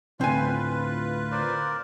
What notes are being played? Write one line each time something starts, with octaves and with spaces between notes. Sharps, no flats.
D2 A2 C4 F4 B4 G#5
A#4 C5 D5